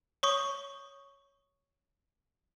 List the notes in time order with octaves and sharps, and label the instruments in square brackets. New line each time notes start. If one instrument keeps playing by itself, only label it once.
[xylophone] C#5 C#6 D#6